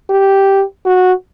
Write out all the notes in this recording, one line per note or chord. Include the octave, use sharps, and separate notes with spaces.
G4
F#4